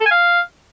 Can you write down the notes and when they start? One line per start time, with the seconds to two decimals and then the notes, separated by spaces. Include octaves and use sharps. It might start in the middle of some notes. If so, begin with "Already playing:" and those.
0.01 A4
0.06 G#5
0.11 F5